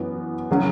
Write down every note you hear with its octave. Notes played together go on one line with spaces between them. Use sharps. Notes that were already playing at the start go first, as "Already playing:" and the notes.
Already playing: F#2 E3 B3 F#4
C#3 F#3 C#4